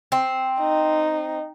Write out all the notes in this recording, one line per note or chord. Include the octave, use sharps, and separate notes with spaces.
C4
D#4